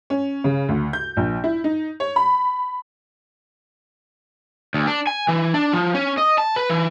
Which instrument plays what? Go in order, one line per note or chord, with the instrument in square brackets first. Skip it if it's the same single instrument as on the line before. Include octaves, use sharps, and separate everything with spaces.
[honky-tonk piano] C#4
C#3
D2
G6
A#1
E4
D#4
C#5
B5
[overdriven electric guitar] D2
D4
G#5
E3
D4
F3
C#4
D#5
A5
B4
E3